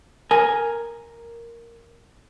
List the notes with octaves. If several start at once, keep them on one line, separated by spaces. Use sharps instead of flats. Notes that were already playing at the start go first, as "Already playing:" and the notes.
A#4 G#5